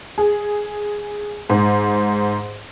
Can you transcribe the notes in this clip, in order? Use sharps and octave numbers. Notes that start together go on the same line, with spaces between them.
G#4
G#2